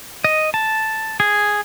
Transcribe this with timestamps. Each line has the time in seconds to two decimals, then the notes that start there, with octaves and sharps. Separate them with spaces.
0.24 D#5
0.54 A5
1.20 G#4